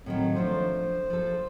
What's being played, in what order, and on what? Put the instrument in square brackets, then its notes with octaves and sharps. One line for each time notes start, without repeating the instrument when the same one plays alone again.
[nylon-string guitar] A2 D#3 F#3 [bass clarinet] C4
[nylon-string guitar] F3 A3 D4 [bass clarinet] C5
[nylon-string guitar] F3 A4